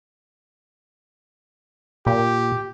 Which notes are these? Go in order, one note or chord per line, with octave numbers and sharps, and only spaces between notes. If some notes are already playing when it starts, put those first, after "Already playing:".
A#2 G4